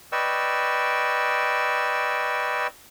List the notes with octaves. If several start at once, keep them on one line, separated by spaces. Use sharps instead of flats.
B4 D5 D#5 G5 C#6 E6